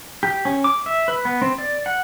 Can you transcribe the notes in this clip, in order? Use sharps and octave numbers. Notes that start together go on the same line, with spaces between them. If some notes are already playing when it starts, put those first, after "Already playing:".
G4
C#4
D6
E5
B4
B3
C4
D5
F#5